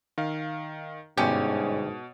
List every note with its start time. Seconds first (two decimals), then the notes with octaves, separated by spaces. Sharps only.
0.18 D#3 F5
1.18 G1 G#2 B2 C#4 G4